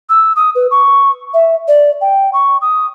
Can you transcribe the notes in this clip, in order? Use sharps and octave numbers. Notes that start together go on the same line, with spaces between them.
E6
D#6
B4
C#6
E5
D5
G5
C#6
D#6